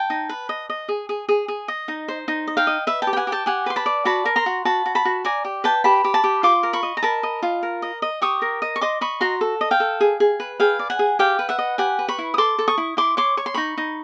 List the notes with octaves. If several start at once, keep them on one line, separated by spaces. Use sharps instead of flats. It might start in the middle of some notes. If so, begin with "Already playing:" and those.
Already playing: G5 A5
D#4
B4
D#5
D#5
G#4
G#4
G#4
G#4
D#5
D#4
C5
D#4
D#5
F5 G5
D#5
B4 E5
G5 A5
G4
G5
F#5 G#5
G4
G5 A5
G4 F#5 G#5
B4 C6
A5 B5
D5
F#4 A5 B5
A#4
A#5 C6
F#4
F#4 A5 B5
F#4
A5 B5
F#4
D5 G#5 A#5
G4
B4 G5 A5
G4 A5 B5
G4
A5 B5
G4
F4 C6 D6
A#4
B5 C#6
D#5
A#5
A#4 A5 B5
D#5
F4
A#4
D#5
D#5
G4 C#6 D#6
A#4
D#5
C#6
D#5 C6 D6
D#5 B5 C#6
F#4 A#5 C6
A4
D#5
F5 G5
A4
G#4
G#4
B4
G#4 F5 G5
D5
F#5 G#5
G#4
G4 F5 G5
B4
E5 F#5
D#5
G4 F#5 G#5
B4
B5 C#6
E4
D#6
A4 C6 D6
A4
C#6 D#6
E4
E4 C6 D6
C#5 C6 D6
C#5 C#6
C6
D#4 B5 C#6
D#4